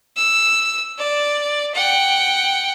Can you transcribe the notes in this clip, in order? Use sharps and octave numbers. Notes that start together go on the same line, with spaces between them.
E6
D5
F#5 G5